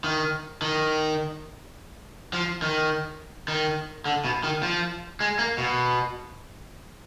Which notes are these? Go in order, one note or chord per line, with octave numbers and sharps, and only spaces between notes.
D#3
D#3
F3
D#3
D#3
D3
B2
D#3
F3
G#3
A#3
B2